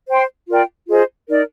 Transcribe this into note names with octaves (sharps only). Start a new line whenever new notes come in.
C5 G5 C6
F4 A#4 D5 G5
F4 G#4 C5 D#5
D#4 A#4 D5